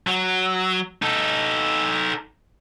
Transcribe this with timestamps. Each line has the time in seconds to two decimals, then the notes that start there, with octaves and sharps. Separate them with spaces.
0.07 F#3
1.02 D#4 A4